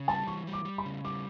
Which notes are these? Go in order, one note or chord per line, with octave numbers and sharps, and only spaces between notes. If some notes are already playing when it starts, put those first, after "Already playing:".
Already playing: C#3
G3 A5
E3 C#6
G3
D6
G3
B5
C#3
G3 D6